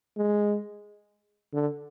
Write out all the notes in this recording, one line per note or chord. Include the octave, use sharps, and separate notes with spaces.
G#3
D3